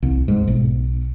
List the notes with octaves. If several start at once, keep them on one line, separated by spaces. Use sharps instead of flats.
C2
G#2
B1